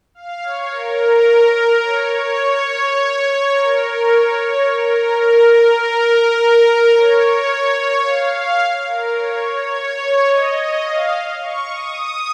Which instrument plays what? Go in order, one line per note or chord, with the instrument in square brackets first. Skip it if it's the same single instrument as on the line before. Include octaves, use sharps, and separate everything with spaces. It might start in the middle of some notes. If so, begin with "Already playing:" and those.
[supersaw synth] F5
C#5
A#4
C#5
C#5
A#4
C#5
C#5
A#4
A#4
A#4
C#5
F5
A#4
C#5
C#5
C#5
D#5
D#5
F5
C#6
D#6